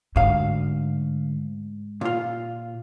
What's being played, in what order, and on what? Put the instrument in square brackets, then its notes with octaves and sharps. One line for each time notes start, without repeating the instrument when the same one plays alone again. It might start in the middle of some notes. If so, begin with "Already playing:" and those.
[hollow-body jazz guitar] D2 F5 [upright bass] G#2
[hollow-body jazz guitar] A#2 F4